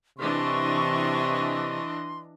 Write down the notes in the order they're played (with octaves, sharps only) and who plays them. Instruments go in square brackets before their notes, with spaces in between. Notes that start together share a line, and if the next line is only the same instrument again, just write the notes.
[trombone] C3 [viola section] E3 D4 D#5 [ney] C6 [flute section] C#6